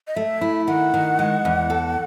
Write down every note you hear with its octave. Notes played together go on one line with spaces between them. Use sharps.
D#5
A3 E5
E4
D#3 F#5
D#3
G#3
E2
A4